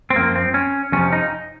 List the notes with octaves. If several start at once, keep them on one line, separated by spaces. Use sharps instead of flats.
C4
F#2 F3 A#3
C4
C#4
F2 C3 F3 C#4
D#4